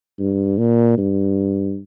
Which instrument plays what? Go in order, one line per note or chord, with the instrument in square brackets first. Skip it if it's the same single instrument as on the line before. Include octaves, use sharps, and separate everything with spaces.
[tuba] G2
A#2
G2